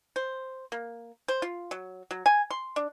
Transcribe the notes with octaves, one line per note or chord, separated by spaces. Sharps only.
C5
A#3
C5
F4
F#3
F#3
G#5
C6
D4